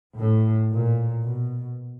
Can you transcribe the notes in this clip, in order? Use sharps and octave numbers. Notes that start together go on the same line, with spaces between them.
A2
A#2
B2